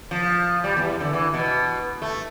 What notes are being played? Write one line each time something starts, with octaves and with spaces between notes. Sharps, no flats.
F3
G3
E2
D3
E3
B2
A3